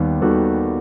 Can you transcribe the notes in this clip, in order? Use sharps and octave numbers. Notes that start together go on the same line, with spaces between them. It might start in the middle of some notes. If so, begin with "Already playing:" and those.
Already playing: D#2 D#3 G3 B3
D#2 D#3 G3 B3 F#4 A4